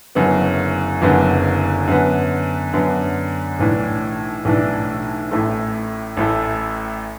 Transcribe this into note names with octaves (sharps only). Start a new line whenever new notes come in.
F#1 F#2 D3 B3
F#1 F#2 D3 B3
F#2 D3 B3
F#2 D3 B3
B1 A2 E3 D4
B1 A2 E3 D4
A1 A2 A3
A1 A2 A3